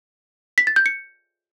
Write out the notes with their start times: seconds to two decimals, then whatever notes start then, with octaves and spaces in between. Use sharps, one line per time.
0.58 B6
0.67 A6
0.76 G6
0.86 C#7